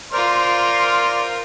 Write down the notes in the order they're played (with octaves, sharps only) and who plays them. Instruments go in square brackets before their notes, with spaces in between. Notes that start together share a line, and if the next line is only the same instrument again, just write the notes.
[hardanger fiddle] F4 A#4 [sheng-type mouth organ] C5 D5 F6 [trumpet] C6